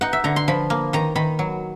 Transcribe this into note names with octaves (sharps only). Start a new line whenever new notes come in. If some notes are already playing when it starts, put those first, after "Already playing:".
D#4 F#5
E5
D3 A#5
C6
F3 B5
A#3
D#3 A#5
D#3 B5
F#3